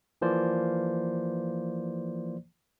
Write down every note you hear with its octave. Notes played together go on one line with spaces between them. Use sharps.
E3 F3 A#3 C5 D5